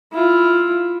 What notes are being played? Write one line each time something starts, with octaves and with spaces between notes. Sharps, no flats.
E4 F4